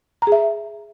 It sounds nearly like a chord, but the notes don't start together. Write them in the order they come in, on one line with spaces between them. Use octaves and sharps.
A#5 G#4 E5